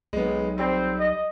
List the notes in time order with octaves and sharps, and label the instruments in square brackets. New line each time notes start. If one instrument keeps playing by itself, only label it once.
[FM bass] B1 [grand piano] G#3 B3
[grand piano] G3 [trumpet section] C4
[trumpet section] D#5